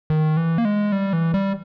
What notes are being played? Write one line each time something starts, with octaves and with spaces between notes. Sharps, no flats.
D#3
E3
A#3
G#3
G3
E3
G3